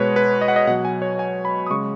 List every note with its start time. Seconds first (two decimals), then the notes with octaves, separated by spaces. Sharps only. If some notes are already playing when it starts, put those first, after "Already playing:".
Already playing: B2 G#3 B4 C#5
0.16 B4
0.41 D#5
0.48 F#5
0.56 D#5
0.67 B2 F#5
0.70 F#3
0.85 G#5
1.02 C#5
1.19 G#5
1.45 B5
1.67 D#6
1.71 C#3 G#3 C#6